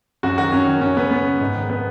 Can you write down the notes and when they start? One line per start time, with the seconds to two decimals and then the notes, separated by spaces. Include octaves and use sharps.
0.23 F#2 F#4
0.38 D#3 F#4
0.52 F#2 C#4
0.67 D#3
0.81 F#2 C#4
0.97 C#3 B3
1.11 F#2 B3
1.25 C#3
1.41 G#2
1.55 D#3
1.70 B3